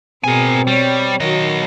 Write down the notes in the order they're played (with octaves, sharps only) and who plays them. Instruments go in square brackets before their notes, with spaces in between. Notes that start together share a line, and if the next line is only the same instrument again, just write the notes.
[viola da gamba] B2 G#4 [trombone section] C4 [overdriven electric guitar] A#4 G#5
[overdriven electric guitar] G3 [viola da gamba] C#5
[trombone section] D#3 [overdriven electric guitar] F#3 D#5 [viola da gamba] F#4